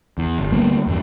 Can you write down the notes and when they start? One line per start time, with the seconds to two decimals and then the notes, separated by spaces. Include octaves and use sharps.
0.18 E2
0.39 G1
0.52 D2 G3 A#3 B3
0.86 E2 G2